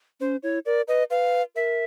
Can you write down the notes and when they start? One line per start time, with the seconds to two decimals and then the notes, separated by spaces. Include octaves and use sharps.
0.20 C#4 C5
0.43 E4 C#5
0.66 A#4 D5
0.87 B4 D#5
1.10 B4 F5
1.55 A#4 E5